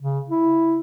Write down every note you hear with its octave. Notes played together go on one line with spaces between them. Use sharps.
C#3
E4